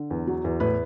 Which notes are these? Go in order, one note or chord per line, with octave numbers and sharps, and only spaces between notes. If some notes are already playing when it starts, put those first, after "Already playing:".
Already playing: D3
E2
F#3
E2
A2 B4